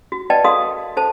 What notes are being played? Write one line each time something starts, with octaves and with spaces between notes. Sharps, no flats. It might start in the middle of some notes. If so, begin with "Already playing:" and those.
F#4
B4 D5 D#5 G5 A5
F#4 A4 A#4 F5 C6 D#6
A4 C5 A5